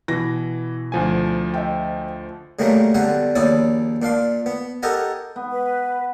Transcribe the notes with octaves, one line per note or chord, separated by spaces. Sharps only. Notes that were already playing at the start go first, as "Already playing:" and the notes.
B2 E3 E4 A#6
D2 F3 G#5
D#5 E5 G5
C#3 F#3 G3 A3 A#3 D4
B1 D3 G3 F#5 G#5 C6
A#1 D#2 E4 C#5 D5 D#6
A#2 D4 F5 C6
B3
G4 A4 A#4 D#5 F#5 G#5
B3
B4